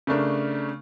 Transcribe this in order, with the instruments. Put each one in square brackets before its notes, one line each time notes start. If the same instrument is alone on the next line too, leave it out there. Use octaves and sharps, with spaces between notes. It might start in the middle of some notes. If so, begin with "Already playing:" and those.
[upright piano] C#3 A3 D4 A#4